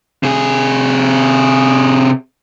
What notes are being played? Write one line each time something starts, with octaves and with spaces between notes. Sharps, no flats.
C3 G#4